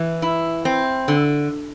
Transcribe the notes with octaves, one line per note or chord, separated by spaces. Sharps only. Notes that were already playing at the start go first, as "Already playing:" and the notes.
Already playing: E3
E4
C4
D3